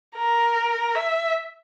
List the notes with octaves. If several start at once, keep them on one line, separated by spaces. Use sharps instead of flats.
A#4
E5